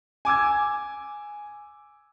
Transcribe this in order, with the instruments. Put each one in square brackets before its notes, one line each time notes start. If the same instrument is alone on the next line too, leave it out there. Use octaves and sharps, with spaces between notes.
[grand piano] G#5 D6 E6 G#6